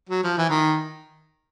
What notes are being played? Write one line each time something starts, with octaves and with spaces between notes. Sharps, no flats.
F#3
F3
E3
D#3